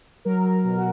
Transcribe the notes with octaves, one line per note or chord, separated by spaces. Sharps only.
F#3 A#4
B2
F#4